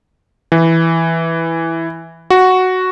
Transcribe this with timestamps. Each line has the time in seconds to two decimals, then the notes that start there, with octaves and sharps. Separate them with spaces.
0.52 E3
2.30 F#4